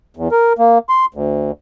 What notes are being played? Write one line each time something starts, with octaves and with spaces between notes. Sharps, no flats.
E2
A#4
A#3
C6
D2